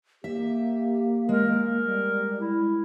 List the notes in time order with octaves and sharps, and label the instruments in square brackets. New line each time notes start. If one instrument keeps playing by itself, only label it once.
[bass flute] A#3 [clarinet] G4 [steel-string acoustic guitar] E5
[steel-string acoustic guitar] G#3 [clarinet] A#4
[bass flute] G3
[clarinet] E4